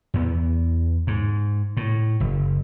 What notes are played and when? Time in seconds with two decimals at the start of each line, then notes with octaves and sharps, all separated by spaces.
0.14 E2 B3
1.07 G#2
1.77 A2
2.20 F#1